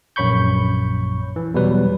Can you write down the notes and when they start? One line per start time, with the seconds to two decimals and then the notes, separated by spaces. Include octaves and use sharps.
0.16 A#1 F#2 C#5 B5 C#6 G6
1.36 E3
1.54 E2 B2 F#3 G3 B4